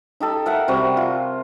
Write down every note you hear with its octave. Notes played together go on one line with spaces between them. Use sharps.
D#4 G4 A4
A#4 E5 F#5 A5
C3 G3 F#4
F4